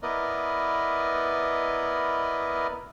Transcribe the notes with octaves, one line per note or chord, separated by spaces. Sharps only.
B3 E4 A#4 B4 D5 D#5